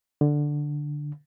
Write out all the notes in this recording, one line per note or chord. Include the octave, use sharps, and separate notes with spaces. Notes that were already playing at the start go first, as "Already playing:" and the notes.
D3